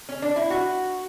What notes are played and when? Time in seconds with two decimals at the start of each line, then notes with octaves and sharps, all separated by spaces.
0.09 C#4
0.22 D4
0.36 E4
0.50 F#4